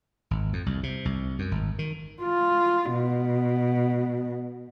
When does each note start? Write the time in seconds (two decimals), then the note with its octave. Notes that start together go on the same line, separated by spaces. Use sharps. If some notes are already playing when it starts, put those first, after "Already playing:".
0.31 G#1
0.53 F2
0.66 C2
0.83 C3
1.05 C2
1.39 F#2
1.51 G#1
1.79 D#3
2.23 F4
2.93 B2